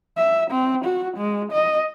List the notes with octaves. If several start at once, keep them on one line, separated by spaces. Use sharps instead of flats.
E5
C4
F#4
G#3
D#5